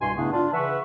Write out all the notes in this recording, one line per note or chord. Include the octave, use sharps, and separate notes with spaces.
C2 G2 B2 G#5 C6
G2 C#3 A3 B3 D4 E4
D4 F4
C#3 E3 B4 E5 F#5 C#6